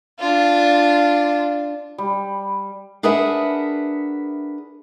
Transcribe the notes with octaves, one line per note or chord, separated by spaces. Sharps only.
D4 F4
G3
D4 G#4 A#4 B4 E5 F#5